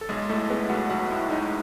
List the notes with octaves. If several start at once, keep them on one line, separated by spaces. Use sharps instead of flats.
A4
B1 G#3 G#4
A2 A3 A4
G#3 B3 B4
B1 F#4 F#5
B1 F#4 F#5
A2
G#3 D#4 D#5